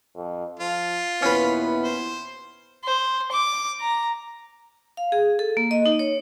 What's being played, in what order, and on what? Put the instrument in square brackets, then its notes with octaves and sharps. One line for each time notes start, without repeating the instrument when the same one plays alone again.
[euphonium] F2
[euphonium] F3 [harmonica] F4
[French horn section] D#2 A#2 E4 [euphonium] B3 [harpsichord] C#4 B4
[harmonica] C5
[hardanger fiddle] C5
D6
A#5
[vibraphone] F5
G#4
A4
A#3
D#5
D#4
C#5